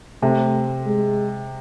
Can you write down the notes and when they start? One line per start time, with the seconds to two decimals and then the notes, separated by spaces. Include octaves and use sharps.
0.22 C3 A3
0.86 G#3